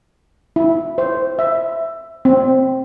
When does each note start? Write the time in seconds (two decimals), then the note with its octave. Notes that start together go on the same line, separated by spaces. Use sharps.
0.56 E4
0.98 C5
1.39 E5
2.25 C4